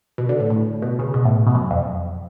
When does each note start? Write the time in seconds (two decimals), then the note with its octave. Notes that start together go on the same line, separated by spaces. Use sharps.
0.18 B2
0.29 D3
0.40 A2
0.50 A2
0.82 B2
0.99 C#3
1.14 B2
1.25 A2
1.47 B2
1.55 F#2
1.70 F2